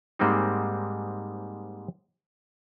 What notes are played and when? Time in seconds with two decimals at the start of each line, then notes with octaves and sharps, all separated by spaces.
0.19 G#2 G3 G#3 A#3 C4 D#4